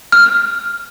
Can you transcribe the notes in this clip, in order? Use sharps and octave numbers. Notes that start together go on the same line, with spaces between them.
F6